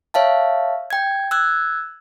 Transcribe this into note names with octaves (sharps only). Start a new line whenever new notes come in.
C#5 E5 F5 A5
G5 G#6
E6 F#6 G#6